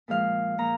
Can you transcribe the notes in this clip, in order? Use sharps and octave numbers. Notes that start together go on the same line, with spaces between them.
A#2 F3 G#3 F5
A#2 F3 A#5